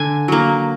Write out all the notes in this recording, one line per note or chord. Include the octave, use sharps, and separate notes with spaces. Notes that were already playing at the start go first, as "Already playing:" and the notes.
Already playing: D3 G#5
F#3 A#3